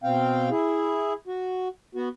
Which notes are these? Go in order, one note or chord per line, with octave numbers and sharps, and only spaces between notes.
B2 C4 F5 G5
E4 G#4
F#4
B3 F#4